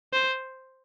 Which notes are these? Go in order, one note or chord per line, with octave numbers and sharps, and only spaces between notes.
C5